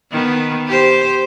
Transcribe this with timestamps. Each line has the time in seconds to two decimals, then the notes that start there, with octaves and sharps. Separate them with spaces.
0.11 D#3 B3
0.67 G4 C5